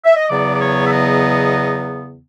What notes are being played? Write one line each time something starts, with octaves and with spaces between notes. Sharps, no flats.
E5
D#5
E2 C#3 F#3 B3 D5
D5
C#5
E5
D#5